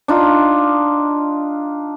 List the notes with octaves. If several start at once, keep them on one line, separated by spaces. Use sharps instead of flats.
D4 D#4 F4